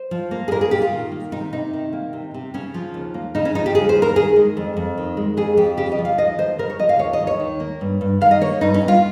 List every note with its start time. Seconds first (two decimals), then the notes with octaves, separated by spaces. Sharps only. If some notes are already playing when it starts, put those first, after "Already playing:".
Already playing: C5
0.11 F3
0.31 A#3
0.48 G#4
0.51 A#2 A#4
0.61 G#4
0.71 A#2 G4
0.82 F4
0.93 D#3
1.12 A#3
1.32 C3 D#4
1.53 C3 D#4
1.73 D#3
1.93 A#3
2.13 C3
2.34 C3
2.54 C#3 C#4
2.74 F3
2.94 D#2
3.14 A#3
3.35 C#3 D#4
3.45 C#4
3.55 F3 D#4
3.66 G4
3.75 D#2 G#4
3.89 C5
3.96 A#3
4.02 A#4
4.16 D#3 G#4
4.36 G#3
4.57 F2
4.77 F2
4.98 D#3
5.17 G#3
5.37 F2 G#4
5.57 F2 G4
5.77 C#3 G4
5.92 D#5
5.98 F3
6.05 F5
6.18 D#2 D#5
6.38 D#2 C5
6.58 C#3 A#4
6.70 C#5
6.79 F3 D#5
6.89 F5
6.99 D#2 C#5
7.13 D#5
7.20 D#2
7.27 C#5
7.40 D#3
7.60 A#3
7.81 G2
8.01 G2
8.21 D#3 F5
8.31 D#5
8.41 A#3 C#5
8.61 G2 D#4
8.74 C#4
8.81 G2
8.88 F4